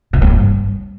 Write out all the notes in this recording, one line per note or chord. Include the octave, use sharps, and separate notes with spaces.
B2
A2
G2